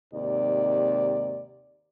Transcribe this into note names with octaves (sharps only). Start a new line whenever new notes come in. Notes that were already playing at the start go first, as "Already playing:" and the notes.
D#2 G#2 C3 D5